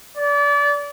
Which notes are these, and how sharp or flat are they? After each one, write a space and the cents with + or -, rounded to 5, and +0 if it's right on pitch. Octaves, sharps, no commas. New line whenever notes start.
D5 -30